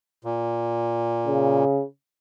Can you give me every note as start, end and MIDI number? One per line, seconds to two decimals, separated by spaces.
0.24 1.64 46
1.27 1.83 49